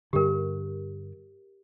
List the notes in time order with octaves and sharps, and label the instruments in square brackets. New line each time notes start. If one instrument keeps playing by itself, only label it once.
[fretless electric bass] G2 D3 [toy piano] G4 A#4